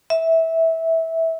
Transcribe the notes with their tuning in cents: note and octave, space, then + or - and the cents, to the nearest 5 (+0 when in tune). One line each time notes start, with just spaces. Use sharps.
E5 -15